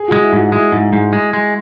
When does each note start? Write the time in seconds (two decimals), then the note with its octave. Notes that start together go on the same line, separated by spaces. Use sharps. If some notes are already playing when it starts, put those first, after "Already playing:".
Already playing: G#4
0.08 G#3 F#4
0.22 E4
0.33 G#2
0.38 F#4
0.52 G#3 E4
0.72 G#2
0.93 G#2
1.13 G#3
1.33 G#3